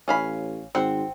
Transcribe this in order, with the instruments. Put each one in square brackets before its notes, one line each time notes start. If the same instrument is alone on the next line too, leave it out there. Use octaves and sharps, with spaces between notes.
[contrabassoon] A1 [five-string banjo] C#4 F5 B5
[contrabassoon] G#1 [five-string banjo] C4 F#5